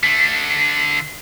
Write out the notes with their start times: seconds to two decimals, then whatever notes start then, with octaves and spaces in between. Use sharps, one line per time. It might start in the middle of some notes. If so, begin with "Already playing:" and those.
0.03 D3 A3